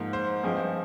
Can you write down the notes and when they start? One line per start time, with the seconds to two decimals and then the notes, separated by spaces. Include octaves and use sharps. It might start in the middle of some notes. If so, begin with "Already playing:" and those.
Already playing: G#2 F3 A#3
0.13 C5
0.44 G2 F3 G#3 C4